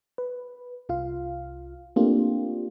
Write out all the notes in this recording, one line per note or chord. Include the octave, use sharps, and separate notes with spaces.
B4
C2 F4 F5
A3 A#3 C4 D4 F4 G4